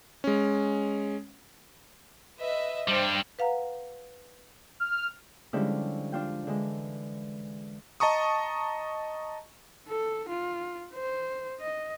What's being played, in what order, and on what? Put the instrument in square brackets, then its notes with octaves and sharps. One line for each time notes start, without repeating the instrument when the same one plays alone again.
[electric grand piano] G#3 C#4
[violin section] B4 D#5 E5
[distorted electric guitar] G2 G3 [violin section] C5 G5
[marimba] B4 F5 F#5 A#5
[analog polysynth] F6
[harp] D3 F3 G3 G#3 C#4 E4
D4 F4 G5
D3 E3 G#3
[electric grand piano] D#5 A5 A#5 C#6 D#6
[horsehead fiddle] A4
F4
C5
D#5